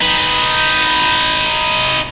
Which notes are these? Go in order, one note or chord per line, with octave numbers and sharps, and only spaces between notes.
D#4 B4